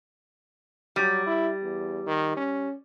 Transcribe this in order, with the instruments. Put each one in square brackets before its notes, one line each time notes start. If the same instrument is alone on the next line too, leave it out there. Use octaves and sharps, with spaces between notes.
[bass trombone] F#3 [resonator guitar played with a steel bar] G3
[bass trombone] E4
E2
D#3
C#4